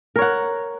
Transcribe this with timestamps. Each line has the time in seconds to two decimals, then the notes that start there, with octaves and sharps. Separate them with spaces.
0.16 A#4
0.19 C#5
0.22 F#5